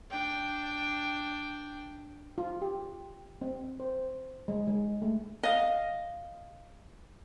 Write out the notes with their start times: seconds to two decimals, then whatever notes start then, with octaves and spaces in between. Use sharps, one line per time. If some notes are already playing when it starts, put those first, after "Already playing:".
0.10 D4 G5
2.38 F4
2.62 G4
3.41 C4
3.80 C5
4.48 G#3
4.67 G#3
5.02 A3
5.43 D#5 F5